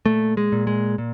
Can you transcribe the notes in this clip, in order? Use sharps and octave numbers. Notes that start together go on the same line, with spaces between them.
A#2 A3
G#3
A#2
G#3
A#2